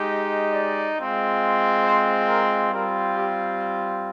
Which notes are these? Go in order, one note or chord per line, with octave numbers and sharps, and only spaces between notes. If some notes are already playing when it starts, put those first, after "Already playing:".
Already playing: G#3 D#4 G4
D#5
D5
G#3 C4 F4
C5
A#4
G3 C4 F4 A#4
G4